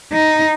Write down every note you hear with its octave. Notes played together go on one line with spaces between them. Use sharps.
D#4